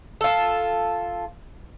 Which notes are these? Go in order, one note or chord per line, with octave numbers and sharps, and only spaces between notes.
F4 A4